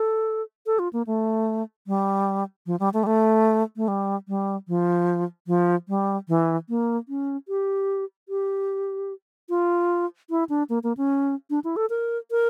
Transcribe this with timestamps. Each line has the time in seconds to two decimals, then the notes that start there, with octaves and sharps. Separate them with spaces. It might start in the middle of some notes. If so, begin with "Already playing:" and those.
Already playing: A4
0.66 A4
0.79 F4
0.93 A#3
1.07 A3
1.87 G3
2.66 F3
2.80 G3
2.94 A3
3.03 G3
3.07 A3
3.77 A3
3.88 G3
4.28 G3
4.68 F3
5.47 F3
5.88 G3
6.29 E3
6.69 A#3
7.09 C#4
7.48 G4
8.29 G4
9.49 F4
10.30 E4
10.49 D4
10.69 A#3
10.83 A#3
10.97 C#4
11.50 D4
11.64 E4
11.76 A4
11.90 A#4
12.31 A#4